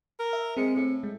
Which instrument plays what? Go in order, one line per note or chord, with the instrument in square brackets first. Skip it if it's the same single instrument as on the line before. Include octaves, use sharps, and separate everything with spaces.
[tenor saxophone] A#4
[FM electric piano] E5
[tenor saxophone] G#3 [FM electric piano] C4 C#7
[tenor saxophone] A2
[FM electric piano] G#3